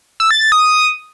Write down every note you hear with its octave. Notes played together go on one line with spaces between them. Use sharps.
E6
A6
A6
D#6